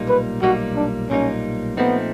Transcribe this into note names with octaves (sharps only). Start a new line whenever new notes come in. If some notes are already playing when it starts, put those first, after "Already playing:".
Already playing: B1 A#2 G3 A#3 D#4
B4
B1 A#2 G3 A#3 D#4 F#4
D4
B1 A#2 G3 A#3 C#4 D#4
A#2 F3 A3 B3 C4 D#4